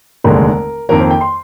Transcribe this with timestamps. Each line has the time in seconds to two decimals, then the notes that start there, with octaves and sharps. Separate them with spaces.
0.24 F1 D#2 D3 G#3 A#4
0.89 F2 D#3 A#3 A#4
1.00 C5
1.11 G5
1.21 C6